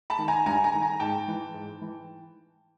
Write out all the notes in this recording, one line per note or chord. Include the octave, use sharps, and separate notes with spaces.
A5 B5
D#3
G#5 A#5
G2 G#5 A#5
G#5 A#5
D#3
G#5 A#5
G#2 G5 A5
E3
G#2
E3